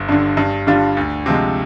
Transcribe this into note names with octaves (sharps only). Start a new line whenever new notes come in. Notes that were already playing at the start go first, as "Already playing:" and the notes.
Already playing: G1
G2 D3
G2
D3 G3 D4 F4
D2
C3 F3 G#3